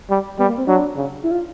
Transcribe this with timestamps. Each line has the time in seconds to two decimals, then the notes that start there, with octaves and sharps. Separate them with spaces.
0.10 G3
0.39 G3 B3
0.48 A#3
0.58 C4
0.67 F#3 D4
0.96 C#3
1.23 E4
1.31 F4